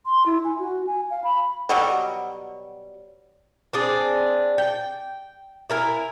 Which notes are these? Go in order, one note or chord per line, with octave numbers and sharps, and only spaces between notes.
C6
E4
G#5
F#4
G#5
F5
B5
B2 F#3 G3
C4 D4 G#4
G5
E4 A#4 G#5